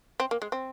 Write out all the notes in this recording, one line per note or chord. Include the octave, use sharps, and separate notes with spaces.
C4
A#3
G#3
C4